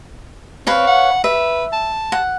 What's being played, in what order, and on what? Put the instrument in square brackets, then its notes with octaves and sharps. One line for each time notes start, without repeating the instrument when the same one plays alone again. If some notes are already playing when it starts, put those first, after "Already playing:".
[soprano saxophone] C4 [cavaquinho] B4 C#5 F5
[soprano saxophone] F#5
[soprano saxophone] B4 [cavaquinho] E5
[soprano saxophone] A5
[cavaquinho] F#5